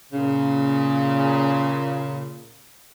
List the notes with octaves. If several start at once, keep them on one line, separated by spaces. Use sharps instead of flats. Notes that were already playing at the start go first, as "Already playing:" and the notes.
A#2 C#3